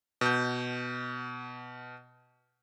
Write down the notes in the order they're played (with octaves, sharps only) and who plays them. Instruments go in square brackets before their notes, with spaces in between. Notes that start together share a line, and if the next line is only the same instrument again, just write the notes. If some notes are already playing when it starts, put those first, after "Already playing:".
[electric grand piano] B2 G6